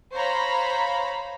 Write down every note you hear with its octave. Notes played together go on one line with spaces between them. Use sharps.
C5 C#5 F5 A#5 B5